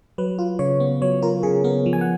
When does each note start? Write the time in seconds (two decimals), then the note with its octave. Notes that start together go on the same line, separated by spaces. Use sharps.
0.18 F#3 B4
0.39 F4
0.59 C#3 C#5
0.80 B3
1.02 F#3 C#5
1.22 F4 A#4
1.43 C#3 G#4
1.64 B3 A#4
1.86 F3
1.93 G#5
2.01 F#5